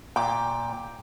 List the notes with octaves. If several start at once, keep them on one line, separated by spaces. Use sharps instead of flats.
A#2 G5 D6